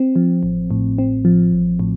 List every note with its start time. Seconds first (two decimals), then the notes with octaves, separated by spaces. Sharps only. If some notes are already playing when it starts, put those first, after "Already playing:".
Already playing: C4
0.16 F3
0.43 A1
0.71 A2
0.98 C4
1.25 F3
1.53 A1
1.80 A2